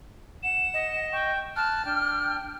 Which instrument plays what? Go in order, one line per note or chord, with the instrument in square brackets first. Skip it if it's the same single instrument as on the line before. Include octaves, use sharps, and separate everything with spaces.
[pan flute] F#5 [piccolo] E7
[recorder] D#5
[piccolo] G5 [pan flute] C#6
[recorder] A5 [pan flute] F6 [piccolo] F#6
[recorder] D4 [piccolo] G5